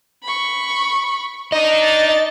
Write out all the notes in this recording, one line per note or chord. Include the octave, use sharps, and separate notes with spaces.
B5 C#6
D4 D#4 D#5 D#6 E7
A6